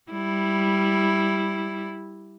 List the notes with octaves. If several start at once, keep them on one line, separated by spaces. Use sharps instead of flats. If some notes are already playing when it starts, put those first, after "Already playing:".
G3 E4